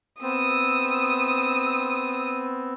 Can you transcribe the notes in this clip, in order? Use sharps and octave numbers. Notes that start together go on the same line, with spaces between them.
B3 C4 D#6 E6